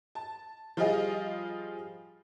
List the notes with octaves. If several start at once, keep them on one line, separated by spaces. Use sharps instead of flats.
A5
F3 G3 F4 G#4 D#5 F5